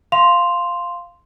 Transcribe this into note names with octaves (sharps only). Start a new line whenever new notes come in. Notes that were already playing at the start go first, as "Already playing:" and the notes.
F5 C6 F7